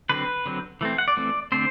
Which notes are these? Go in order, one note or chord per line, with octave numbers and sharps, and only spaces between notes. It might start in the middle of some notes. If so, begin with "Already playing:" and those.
D3 F#3 C4 B4
D3 F#3 C4
E3 A3 C4
F#5
D5
E3 A3 C4
D3 A3 C4 C5